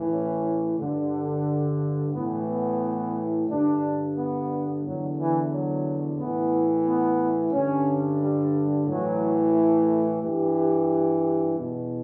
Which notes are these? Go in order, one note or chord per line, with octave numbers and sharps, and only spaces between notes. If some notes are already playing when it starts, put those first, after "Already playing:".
Already playing: A2 E3
C#4
G2 D3
A2 E3 B3
B3
G2 D3 D4
B3
E2 D3 F#3
E3
F#3
A2 E3 B3
B3
G2 D3 C#4
G3
A2 E3 F#3
A3
G2 E3 G4
E2 B2